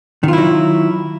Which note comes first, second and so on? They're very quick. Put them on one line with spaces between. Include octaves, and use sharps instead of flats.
D#3 F4 E4 F#3